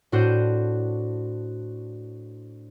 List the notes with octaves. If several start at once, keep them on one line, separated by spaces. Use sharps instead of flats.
A2 D4 F#4 C5 G6 D#7